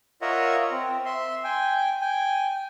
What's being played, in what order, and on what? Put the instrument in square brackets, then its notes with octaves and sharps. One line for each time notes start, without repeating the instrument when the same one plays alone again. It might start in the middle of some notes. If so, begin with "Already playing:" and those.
[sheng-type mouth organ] F4 A#4 C#5 D#5 E5 F#5
C4
E5 C6
G5 G#5
G5 G#5